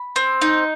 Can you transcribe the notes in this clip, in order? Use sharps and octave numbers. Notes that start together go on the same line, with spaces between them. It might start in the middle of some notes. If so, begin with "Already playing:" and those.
Already playing: B5
C4
D#4